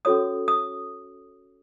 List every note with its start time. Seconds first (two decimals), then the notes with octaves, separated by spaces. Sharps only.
0.05 C#4 F#4 A4 C#5 D#6
0.48 D#6